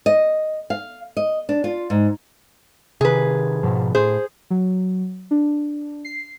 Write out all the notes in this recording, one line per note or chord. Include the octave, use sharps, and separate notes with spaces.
D#5
F5
D#5
D4
F4
G#2
C3 D#3 G#4 B4
G#2 B2 F3
A2 G#4 C5
F#3
D4
C7